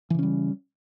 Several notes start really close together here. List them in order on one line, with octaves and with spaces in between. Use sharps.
E3 C#3 C#4 G3